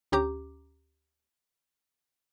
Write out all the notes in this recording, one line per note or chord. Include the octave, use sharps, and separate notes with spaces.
D2 C#4 G4 A#5 D6